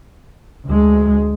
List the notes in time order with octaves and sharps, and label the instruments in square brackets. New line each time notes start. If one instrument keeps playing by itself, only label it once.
[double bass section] D2 G#3